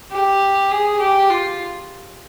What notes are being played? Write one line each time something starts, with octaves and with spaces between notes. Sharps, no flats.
G4
G#4
G4
F4